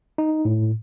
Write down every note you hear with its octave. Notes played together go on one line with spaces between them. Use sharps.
D#4
A2